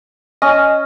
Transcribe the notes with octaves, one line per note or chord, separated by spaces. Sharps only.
C#4 D#5